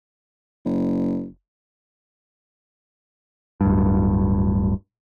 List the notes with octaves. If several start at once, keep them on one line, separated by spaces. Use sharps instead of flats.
F#1
D1 G2